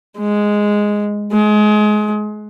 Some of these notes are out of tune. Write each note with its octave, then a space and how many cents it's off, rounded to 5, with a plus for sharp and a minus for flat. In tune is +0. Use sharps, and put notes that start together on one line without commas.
G#3 +0
G#3 +25